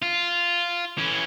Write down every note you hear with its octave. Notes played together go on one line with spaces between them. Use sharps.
F4
E3 C#4